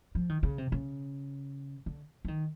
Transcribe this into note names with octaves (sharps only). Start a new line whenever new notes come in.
F3
D#3
C#3
C3
C#3
D3
E3
D#3